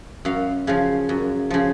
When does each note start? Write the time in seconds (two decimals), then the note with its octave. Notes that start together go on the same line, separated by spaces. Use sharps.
0.25 F#2 F5
0.67 C#3 F3 F5
1.09 F#2
1.50 C#3 F3